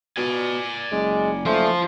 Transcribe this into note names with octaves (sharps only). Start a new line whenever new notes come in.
B2 D5 G#5
F#1 G#3
A3 F4 C5